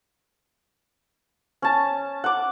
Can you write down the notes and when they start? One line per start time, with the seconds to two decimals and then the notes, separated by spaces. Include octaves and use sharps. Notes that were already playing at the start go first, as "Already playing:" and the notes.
1.62 C#4 A5
2.24 F#5 D6